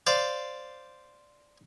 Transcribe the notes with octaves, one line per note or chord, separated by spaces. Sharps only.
C5 D5 F5